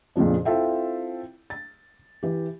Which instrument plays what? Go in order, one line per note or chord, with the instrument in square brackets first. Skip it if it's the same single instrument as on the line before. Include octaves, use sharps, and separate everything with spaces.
[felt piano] F2 A#2 C#3 F3 D4
C4 E4 F4 A4 E5 G5
A6
E3 G4